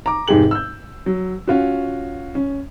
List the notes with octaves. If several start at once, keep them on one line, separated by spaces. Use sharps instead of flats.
A#5 D6
F1 G#2 G4 G#4 F#7
E6 G6
F#3
C#4 F4 F#4
C#4